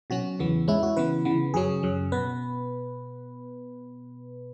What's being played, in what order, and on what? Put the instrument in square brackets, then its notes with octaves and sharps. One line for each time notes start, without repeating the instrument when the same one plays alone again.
[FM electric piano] B2 F#3 C#4 F#4
E2 C#3 E3 B3
G#2 G#3 C#4 E4
F#4
C#3 E3 B3 B4
C#3 E3 B3
F#2 C#3 F#3 C#4 G#4
F#2 C#3 F#3
B2 B3 B4